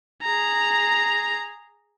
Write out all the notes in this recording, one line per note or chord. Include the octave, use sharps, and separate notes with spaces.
G#4 A#5